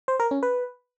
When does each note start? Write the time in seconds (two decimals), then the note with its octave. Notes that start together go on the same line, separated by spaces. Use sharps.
0.08 C5
0.20 A#4
0.31 C#4
0.43 B4